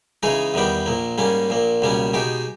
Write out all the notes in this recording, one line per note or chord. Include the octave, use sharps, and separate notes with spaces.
C#3 E3 G#3 D#4 G#4
E2 D#3 G3 B3 G4
A#1 A#2 A#3
G#2 G3 A#3 C#4
A#1 A#2 A#3
C#2 B2 G3 A#3 C#4
B2 G#3 D#4 G4